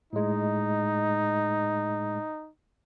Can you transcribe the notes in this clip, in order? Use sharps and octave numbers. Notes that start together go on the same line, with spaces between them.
A2 G#3 D#4